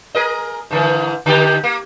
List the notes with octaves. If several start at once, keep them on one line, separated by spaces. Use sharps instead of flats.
G#4 A#4 D#5
G#2 D3 E3
D3 D#3 G4
A#3